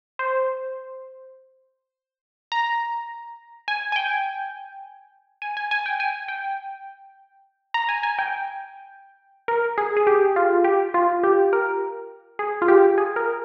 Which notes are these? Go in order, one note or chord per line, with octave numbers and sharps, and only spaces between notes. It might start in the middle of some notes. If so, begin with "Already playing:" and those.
C5
A#5
G#5
G#5
G5
G#5
G#5
G#5
G5
G#5
G5
A#5
G#5
G#5
G5
A#4
G#4
G#4
G4
F4
G4
F4
G4
A#4
G#4
F4
G4
G#4
A#4